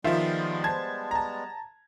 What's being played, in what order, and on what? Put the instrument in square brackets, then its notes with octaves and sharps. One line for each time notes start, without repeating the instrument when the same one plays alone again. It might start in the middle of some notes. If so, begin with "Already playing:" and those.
[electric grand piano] D#3 F3 [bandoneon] G3 G#3 B3 [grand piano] F4 [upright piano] E5
[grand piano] C5 A5 [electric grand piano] G#6
[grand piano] A5 A#5